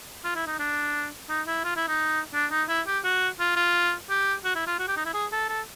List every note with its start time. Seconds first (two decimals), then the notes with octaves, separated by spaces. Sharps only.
0.24 F4
0.36 E4
0.47 D#4
0.59 D4
1.29 D#4
1.47 E4
1.64 F4
1.76 E4
1.88 D#4
2.34 D4
2.51 D#4
2.69 E4
2.87 G4
3.04 F#4
3.39 F4
3.56 F4
4.09 G4
4.44 F#4
4.55 E4
4.67 F4
4.79 F#4
4.88 G4
4.97 D#4
5.06 E4
5.14 G#4
5.32 A4
5.49 A4